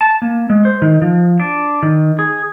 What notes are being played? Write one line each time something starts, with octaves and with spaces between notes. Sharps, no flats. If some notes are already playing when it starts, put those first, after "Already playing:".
A5
A#3
G#3
C5
D#3
F3
D4
D#3
G#4